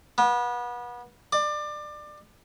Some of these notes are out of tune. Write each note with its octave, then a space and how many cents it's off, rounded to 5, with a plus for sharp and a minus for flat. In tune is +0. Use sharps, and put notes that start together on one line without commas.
B3 -30
D5 +25